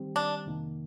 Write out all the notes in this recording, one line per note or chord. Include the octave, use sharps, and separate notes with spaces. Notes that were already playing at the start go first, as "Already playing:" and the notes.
Already playing: D#3 G3 C4 G4
D4
F2 C3 D#3 A#3